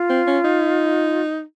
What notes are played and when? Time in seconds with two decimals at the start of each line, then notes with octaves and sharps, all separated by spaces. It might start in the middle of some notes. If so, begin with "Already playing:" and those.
Already playing: F4
0.10 C4
0.27 C#4
0.44 D#4